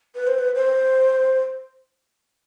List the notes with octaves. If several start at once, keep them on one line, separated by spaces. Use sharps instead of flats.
B4
C5
B4
C5